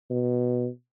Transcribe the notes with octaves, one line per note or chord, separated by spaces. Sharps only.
B2